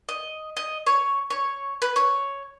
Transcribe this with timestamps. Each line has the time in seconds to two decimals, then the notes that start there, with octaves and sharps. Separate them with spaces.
0.09 D#5
0.57 D#5
0.87 C#5
1.30 C#5
1.82 B4
1.96 C#5